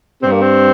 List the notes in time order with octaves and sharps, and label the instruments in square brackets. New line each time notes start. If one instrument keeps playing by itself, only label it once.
[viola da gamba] G2 [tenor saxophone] C4
[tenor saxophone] A#3
C4